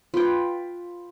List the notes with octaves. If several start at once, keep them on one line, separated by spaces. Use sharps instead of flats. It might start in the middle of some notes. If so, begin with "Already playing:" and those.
F4 B4 G5